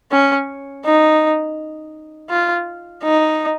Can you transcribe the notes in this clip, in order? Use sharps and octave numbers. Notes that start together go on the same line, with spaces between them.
C#4
D#4
F4
D#4